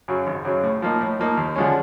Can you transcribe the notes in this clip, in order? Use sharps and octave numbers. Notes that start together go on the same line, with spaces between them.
F#2 C#3 F#3
G#1
F#2 C#3 F#3
A2
F3 A#3 D#4
A2
F3 A#3 D#4
D#2
D3 F3 G#3 C#4